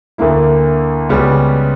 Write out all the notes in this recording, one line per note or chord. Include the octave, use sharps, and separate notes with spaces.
D2 D3 A#3 E4
C#2 C#3 G3 B3